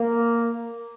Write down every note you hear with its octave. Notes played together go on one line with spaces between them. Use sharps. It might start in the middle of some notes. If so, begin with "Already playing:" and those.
Already playing: A#3